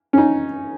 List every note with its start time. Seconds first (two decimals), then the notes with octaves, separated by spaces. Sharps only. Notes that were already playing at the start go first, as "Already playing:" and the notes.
0.13 C#4
0.18 D#4